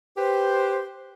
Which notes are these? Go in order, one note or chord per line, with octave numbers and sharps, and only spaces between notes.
G4 B4 C5